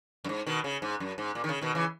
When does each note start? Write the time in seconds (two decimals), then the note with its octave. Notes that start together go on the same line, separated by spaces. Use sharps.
0.24 F#2
0.29 G#2
0.47 B2 D#3
0.64 C#3
0.82 G#2
1.00 F#2
1.18 G#2
1.35 A#2
1.44 D#3
1.49 C#3
1.61 B2 D#3
1.75 C#3 E3